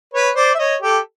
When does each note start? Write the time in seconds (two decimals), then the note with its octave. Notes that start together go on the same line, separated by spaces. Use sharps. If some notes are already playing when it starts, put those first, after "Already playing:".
0.14 B4 C#5
0.36 C5 D5
0.55 E5
0.59 C#5 D#5
0.82 G4 A4